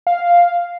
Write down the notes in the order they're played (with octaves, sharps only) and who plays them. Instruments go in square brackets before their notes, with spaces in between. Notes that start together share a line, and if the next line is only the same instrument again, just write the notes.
[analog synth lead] F5